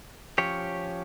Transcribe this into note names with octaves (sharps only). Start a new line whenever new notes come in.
F3 C#4 G4 C#5